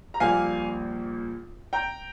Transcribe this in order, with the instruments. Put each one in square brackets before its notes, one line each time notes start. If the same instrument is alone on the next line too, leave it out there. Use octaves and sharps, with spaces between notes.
[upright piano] A#5
A#1 A#2 G3 A#3 F5 G#5
G5 A#5